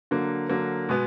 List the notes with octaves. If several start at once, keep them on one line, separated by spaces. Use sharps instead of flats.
D3 F#3 A#3
D3 F#3 A#3
B2 G#3 B3